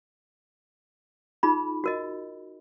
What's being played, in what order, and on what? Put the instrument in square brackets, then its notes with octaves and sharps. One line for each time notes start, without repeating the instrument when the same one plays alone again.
[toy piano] D#4 F4 G#4 B5
F#4 A#4 D#5